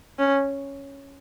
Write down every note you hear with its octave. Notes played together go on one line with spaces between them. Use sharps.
C#4